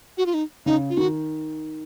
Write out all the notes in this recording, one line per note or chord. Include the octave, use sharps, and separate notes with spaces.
F#4
F4
D#4
C#3 D#4
F4
D#3 F#4